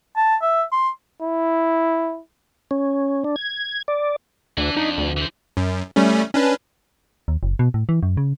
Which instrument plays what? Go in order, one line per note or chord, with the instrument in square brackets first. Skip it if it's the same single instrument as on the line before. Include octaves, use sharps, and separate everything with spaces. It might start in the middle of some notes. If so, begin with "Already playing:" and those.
[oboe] A5
E5
C6
[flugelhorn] E4
[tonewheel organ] C#4
D4
G#6
D5
[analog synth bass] D2 [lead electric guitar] E3 [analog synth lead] D4
[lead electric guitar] F2 [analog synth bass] D#4
[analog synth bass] D2
[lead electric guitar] E3 C5
[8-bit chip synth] F#2
G3 A3 C#4
C#4 D4 B4
[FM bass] D#2
F#1
B2
A2
E3
F#2
C#3